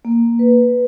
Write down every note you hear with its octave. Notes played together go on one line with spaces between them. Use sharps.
A#3
B4